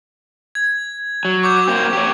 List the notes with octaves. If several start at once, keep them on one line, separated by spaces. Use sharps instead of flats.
G#6
F#3
C#6 D6 G6
A#3 C4
G4 C#5